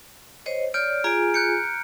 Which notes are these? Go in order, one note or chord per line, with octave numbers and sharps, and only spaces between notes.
C5 C#5 D#5
C#5 D5 F6 G6 D7
F4 G#4 G#5 A#5 D7
F#6 G6 C#7